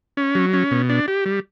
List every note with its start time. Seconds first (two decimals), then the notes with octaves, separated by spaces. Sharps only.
0.17 C#4
0.35 F#3
0.53 C#4
0.71 B2
0.89 D4
1.08 G4
1.26 G3